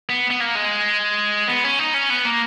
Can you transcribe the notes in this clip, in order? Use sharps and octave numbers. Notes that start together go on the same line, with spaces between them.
B3
B3
A#3
G#3
B3
C#4
D#4
C#4
B3
A#3